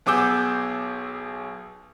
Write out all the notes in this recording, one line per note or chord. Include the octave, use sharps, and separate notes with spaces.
B1 B3 G#4 D6 E6 G6